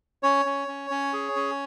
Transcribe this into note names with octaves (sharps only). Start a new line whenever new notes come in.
C#4 C#5
C#4
C#4
C#4
G#4
C#4